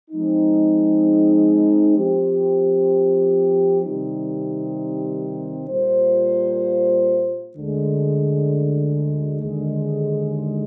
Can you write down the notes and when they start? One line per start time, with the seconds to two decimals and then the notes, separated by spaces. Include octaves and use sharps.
0.11 F3 G#3 C4 D#4
1.97 F3 C4 G4
3.83 C3 D#3 G3 C4 D#4
5.68 A#2 G3 A#3 F4 C5
7.55 D2 D3 G#3
9.41 D#2 D3 G#3